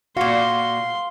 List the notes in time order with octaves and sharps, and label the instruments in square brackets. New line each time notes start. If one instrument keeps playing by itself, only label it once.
[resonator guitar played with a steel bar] A#2 F#4 [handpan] F5 [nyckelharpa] C6